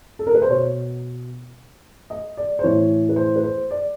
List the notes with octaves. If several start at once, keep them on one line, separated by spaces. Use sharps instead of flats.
A4
A#4
B4
C5
B2 C#5
D#5
D5
C5
A2 E3 C#5
B4
C5
B4
C5
D5